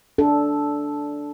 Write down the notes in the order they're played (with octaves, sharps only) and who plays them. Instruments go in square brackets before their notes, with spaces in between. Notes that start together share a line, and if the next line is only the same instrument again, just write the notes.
[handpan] D4 A4